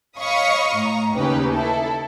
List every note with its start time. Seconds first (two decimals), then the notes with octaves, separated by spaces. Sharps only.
0.18 C#5 D#5 F5 B5 C#6 D#6
0.76 A2 A#5
1.15 D#2 C#3 C#4 D#4 G4 B4
1.52 E4 A4